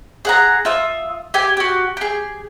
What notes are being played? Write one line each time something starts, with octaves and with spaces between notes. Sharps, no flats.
G#4 F#5 A#5
F4 E5 D#6
G4 G#5
F#4 G4
G4 G#4